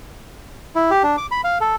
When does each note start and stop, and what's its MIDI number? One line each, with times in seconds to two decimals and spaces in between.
0.75 0.90 64
0.91 1.03 67
1.03 1.16 62
1.17 1.27 86
1.31 1.41 83
1.44 1.58 77
1.61 1.76 69